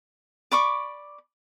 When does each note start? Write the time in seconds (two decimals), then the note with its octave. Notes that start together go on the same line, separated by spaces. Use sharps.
0.52 D5 B5 C#6 D6